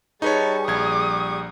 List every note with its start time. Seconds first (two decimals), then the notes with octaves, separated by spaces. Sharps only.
0.22 G3 D#4 G#4 B4 C#5 A5 C#6
0.68 A#1 D#6 G#6